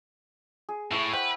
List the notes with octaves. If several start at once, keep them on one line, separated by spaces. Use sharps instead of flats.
G#4
A2 E4 C#6 D#6
B4 C5 F#5 G5